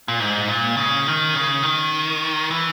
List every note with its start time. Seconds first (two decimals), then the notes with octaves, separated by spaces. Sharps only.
0.08 A#2
0.19 G#2
0.48 A#2
0.77 C#3
1.06 D#3
1.35 C#3
1.63 D#3
2.51 E3